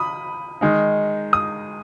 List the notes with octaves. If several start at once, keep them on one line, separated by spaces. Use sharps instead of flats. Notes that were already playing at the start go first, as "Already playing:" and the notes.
Already playing: B5 D#6
D#3 G#3 D#4
D#6